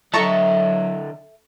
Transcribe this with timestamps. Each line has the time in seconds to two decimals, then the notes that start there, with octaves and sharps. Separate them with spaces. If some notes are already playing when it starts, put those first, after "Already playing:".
0.13 D3 F#3 A4 D#5 E5 A5 A#5 C#6